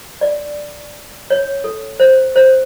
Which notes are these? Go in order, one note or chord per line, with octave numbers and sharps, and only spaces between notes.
D5
C#5
A4
C5
C5